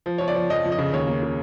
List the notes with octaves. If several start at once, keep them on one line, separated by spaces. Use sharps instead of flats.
F3
F3 C#5
D5
F3
F2 D#5
F2
D#5
C#3
D#2 C#5
A#3
C#3